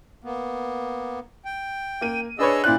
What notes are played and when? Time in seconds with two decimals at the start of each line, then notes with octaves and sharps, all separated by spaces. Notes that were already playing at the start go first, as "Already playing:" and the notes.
0.24 A#3 B3
1.45 G5
2.01 A#3 D#7
2.39 D4 G#4 B4 C#5 D#5 E6
2.64 A#2 E4 C5 D5 F#6